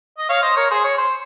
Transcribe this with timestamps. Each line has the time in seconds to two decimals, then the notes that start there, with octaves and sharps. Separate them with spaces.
0.18 D#5
0.29 C#5 F5
0.42 C5 D#5
0.56 A#4 C#5
0.71 G#4 C5
0.84 C#5
0.98 C5